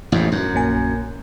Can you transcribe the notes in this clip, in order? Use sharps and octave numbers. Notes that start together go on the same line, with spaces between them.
A1 F2 G#2
F#2
A#1 A#3 G#5